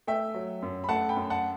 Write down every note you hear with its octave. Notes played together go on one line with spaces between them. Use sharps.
A3 E5 G5
F#3
F#2
B5
A3 F#5 A5
G5 B5
F#2
F#5 A5